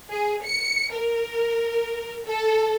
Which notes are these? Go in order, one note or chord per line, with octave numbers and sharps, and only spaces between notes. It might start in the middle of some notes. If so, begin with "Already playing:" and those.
G#4
C#7
A#4
A4